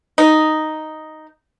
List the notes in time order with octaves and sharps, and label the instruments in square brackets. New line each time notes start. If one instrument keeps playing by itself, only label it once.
[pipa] D#4